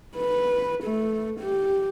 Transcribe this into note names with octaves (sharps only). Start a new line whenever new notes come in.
B4
A3
G4